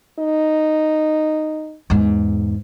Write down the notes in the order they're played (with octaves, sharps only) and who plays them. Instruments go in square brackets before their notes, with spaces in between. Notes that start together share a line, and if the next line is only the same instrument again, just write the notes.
[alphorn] D#4
[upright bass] E2 G#2